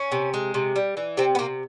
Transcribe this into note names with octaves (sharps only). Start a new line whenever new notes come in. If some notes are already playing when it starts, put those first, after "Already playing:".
Already playing: C#4
C3
G#3
C3
G3
E3
C3 C4
B3
C3 A#3